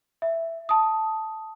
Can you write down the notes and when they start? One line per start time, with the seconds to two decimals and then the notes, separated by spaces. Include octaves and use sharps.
0.22 E5
0.69 A5 D#6